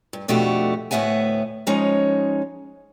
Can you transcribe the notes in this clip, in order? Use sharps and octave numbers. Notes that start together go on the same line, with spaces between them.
G2
F2 B2 A3 D4 F#4 G4
D2 A2 B3 E5 F#5 G#5
F3 G#3 C#4 D#4 C#5